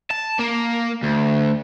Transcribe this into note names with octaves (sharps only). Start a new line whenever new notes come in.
A5
A#3
D2